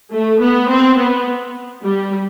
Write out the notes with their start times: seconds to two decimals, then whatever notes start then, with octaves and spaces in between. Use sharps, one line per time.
0.11 A3
0.39 B3
0.69 C4
0.97 B3
1.83 G3